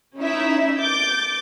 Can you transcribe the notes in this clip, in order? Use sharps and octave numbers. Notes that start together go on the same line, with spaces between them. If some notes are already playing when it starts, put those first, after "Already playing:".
C#4 D#4 E4 E5
D6 G6 A6